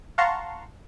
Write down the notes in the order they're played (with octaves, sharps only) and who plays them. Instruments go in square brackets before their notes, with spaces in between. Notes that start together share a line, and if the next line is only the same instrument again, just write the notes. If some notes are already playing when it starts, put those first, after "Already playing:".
[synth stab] F5 F#5 A5 A#5 C6 C#6